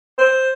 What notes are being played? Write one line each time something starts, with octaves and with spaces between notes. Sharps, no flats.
C5